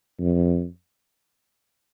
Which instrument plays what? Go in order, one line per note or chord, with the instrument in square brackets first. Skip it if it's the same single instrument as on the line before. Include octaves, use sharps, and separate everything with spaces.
[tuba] F2